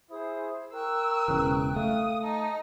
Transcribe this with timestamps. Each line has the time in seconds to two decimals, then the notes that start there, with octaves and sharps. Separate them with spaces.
0.10 E4 G#4 C5 D#6
0.73 A#4 G5 C#6 E6 F#6
1.28 E1 C#3 E3
1.76 A3 F5 D#6
2.23 D#4 A5